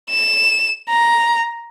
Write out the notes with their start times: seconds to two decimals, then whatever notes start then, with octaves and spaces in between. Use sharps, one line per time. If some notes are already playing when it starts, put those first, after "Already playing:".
0.10 E7
0.89 A#5